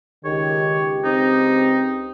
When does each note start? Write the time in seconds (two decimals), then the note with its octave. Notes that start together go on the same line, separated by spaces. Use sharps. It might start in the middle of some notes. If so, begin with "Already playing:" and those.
0.25 C#2 D#3 G4 C#5
1.04 C4 D#4